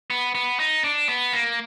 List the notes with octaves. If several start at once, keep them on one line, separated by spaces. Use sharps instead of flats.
B3
B3
D#4
D4
B3
A#3